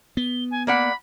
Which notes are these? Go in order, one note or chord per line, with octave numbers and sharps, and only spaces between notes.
B3 G7
G#5
A#3 D5 F#5 B5